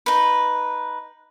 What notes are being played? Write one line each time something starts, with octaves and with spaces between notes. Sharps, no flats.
D#4 B4